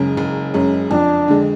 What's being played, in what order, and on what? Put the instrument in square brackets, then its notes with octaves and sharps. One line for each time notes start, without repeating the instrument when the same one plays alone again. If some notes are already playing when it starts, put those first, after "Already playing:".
Already playing: [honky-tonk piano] F#1 F#2 C#3 G#3 C#4
F#1
F#2 C#3 G#3 C#4
[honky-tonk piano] F2 [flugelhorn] D4
[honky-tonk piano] D3 G#3